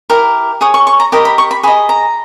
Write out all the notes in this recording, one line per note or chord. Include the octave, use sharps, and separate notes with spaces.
E4 G4 A#4
G#4 C#5 D#6
C#6
C#6
A#5
G4 A#4 D#5 B5
B5
C#6
B5
G#4 D#5 B5
A#5